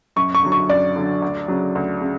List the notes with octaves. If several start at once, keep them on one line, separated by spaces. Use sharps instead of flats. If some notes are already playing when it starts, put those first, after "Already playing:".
F#2 C#6
C#6
D3 F#3
C#6
F#2 D5
D3 F#3
D2
C#3 F#3
D2
C#3